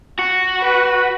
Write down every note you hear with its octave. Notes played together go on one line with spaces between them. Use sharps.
F#4
B4